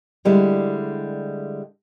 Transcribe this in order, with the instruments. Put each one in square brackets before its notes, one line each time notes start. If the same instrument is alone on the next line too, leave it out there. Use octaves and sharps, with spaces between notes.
[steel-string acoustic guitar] D3 G3 G#3 E4